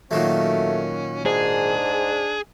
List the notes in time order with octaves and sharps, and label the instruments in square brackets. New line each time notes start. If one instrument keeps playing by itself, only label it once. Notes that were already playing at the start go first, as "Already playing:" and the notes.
[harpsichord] A#2 D#3 F#3 [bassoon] A3 [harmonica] C#4
[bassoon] G#2 [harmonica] D4 [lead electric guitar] G#4